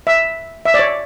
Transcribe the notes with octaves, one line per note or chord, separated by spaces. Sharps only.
E5
E5
D5
C#5